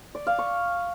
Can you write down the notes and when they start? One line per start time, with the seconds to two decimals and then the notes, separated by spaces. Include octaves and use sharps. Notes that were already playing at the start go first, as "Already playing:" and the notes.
0.15 D5
0.27 F5
0.39 C#6